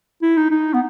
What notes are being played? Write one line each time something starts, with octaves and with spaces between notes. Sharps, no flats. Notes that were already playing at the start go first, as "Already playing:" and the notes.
E4
D#4
D#4
B3